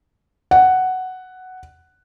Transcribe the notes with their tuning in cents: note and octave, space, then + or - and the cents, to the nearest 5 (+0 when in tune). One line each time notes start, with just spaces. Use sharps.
F#5 +5